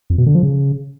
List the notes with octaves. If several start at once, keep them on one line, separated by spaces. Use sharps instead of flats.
F2
B2
D3
F3
C#3